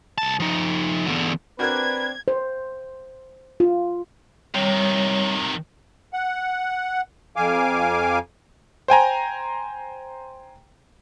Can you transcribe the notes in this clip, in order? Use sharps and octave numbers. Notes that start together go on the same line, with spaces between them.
C2 A5
F3 D#4
E2 D3
C4 D4 F#4 A#4 B4 F#6 G#6
C5
F4
C3 D#3 G3 C#5
F#5
F2 F5 G#5 D6
C5 G5 G#5 A#5